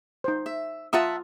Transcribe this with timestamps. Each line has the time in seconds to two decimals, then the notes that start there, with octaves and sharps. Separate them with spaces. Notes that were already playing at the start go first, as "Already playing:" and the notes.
0.24 D#4 C5
0.46 E5
0.93 F4 E5 F#5 A5 A#5 D#6